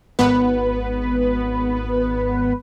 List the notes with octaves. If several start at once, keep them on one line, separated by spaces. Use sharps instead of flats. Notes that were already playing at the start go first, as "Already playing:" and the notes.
G#1 B3 B4